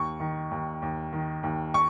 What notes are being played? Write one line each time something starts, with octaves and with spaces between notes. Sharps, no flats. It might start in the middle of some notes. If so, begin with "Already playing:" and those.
Already playing: D#2 C#6
D#3
D#2
D#2
D#3
D#2
C#6